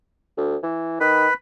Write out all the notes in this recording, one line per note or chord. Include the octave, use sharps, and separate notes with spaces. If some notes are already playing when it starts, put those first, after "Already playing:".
D2
E3
D#3 B4 B5